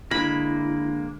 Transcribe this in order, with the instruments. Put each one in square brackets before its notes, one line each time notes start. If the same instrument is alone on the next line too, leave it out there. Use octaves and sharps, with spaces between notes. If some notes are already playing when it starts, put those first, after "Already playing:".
[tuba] D3 [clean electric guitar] G#3 A#3 [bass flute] E4 [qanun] B5